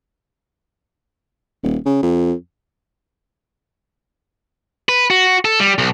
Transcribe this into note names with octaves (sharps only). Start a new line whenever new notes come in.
D#1
C#3
F2
B4
F#4
A4
G3
B1